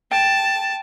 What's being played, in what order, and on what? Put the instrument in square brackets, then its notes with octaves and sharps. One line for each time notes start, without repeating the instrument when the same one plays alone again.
[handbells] G5 [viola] A5